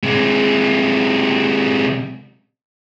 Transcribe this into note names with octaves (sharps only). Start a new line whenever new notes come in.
C3 G#3